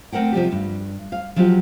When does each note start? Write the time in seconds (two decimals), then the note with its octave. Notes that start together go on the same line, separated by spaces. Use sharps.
0.12 A3 C4 A#4 F#5 G5
0.32 C3 F3 G3 G4
0.52 G2
1.12 F5
1.36 F3 F#3 G#3 F4 G4